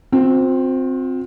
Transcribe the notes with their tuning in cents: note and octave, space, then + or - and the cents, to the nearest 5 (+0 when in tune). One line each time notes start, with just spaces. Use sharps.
C4 +0 F4 +45